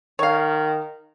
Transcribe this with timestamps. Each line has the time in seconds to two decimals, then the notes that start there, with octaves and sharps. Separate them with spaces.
0.19 D#3 C#5 F5